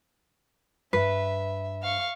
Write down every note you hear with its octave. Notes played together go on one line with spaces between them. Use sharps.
G2 B4 E5
F5 C#6